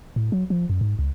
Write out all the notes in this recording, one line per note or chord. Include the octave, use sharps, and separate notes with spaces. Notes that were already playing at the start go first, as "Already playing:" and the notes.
A2
F#3
F3
F#2
G#2
C#2